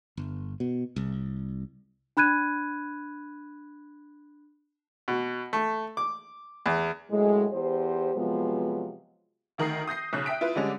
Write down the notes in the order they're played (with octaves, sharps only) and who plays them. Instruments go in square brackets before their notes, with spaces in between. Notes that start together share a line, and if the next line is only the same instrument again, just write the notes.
[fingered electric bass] G1
B2
C2
[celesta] D4 B5 F#6 G#6 D#7
[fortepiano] B2
A3
D6
E2
[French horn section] F#2 A2 G#3
E2 G4 C5
C3 F3 F#3 G#3 B3
[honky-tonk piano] D2 D#3 A#4 D#6 C7
D#6 G6 A#6 C7
B1 C#3 F#6
E5 G5 D#6 B6 D7
E4 F4 B4
D3 G3 G#3 C#4 D4